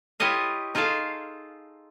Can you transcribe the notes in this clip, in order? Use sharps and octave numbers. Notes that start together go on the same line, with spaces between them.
E4 F4 G4 C#5 D#5 F5
D#4 F4 G#4 A4 F5